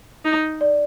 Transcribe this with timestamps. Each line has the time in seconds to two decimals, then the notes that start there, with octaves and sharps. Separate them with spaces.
0.25 D#4
0.61 D5